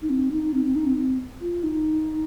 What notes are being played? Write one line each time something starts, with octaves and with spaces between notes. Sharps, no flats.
D#4
C4
D#4
C4
C4
D#4
C4
C4
F4
D#4